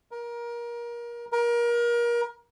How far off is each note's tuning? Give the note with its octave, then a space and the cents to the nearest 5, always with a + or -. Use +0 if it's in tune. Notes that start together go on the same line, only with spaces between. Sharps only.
A#4 +25
A#4 +30